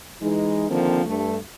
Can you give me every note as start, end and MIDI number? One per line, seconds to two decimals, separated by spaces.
0.21 0.67 52
0.21 0.67 56
0.21 0.67 63
0.69 1.01 50
0.69 1.01 51
0.69 1.01 53
0.69 1.01 58
0.69 1.01 60
1.06 1.37 43
1.06 1.37 57